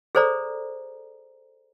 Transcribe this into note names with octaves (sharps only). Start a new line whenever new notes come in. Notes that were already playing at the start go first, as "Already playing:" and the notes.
G#4 A4 C5 D5 A#5